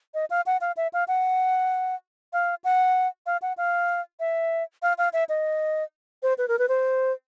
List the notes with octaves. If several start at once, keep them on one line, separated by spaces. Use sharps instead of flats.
D#5
F5
F#5
F5
E5
F5
F#5
F5
F#5
F5
F#5
F5
E5
F5
F5
E5
D#5
C5
B4
A#4
B4
C5